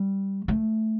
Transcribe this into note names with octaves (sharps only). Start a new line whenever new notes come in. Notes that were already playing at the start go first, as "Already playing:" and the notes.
Already playing: G3
A3